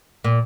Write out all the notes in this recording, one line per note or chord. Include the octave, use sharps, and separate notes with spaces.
A#2